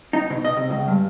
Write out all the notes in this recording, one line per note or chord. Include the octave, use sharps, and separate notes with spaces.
D#4
B2
D#5
C3
C#2
G2